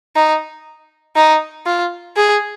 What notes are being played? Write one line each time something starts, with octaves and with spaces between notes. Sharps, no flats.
D#4
D#4
F4
G#4